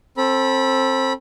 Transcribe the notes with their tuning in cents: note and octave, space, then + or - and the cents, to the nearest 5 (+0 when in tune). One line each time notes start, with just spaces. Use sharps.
C4 +20 A4 +0 B5 -25